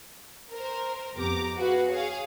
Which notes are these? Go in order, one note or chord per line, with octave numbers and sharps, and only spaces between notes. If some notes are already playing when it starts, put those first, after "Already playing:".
A#4 C5
F2 B3 G4 A#5 D6
F#4 G#4 B4 F5
G#4 C#5 F5